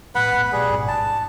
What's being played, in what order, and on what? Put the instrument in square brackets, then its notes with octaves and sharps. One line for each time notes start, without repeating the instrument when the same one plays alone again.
[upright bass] A2 [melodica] B4 F#5 B5
[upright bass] A3 B3
[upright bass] B2 [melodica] G3 G#4
[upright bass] A1 G#2
[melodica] A5